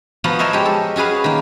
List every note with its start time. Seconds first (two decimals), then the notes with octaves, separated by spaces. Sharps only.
0.24 F3 B3 F#4 F5 A#5
0.39 A4 A#4 C5 C#5 D#5 E5
0.53 G#3 G4
0.66 A4
0.96 C#4 F#4 G#4 B4 F5
1.24 D#3 A#3